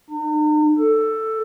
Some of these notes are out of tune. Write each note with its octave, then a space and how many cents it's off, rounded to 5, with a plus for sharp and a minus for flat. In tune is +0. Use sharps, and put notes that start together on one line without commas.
D#4 -45
A4 +10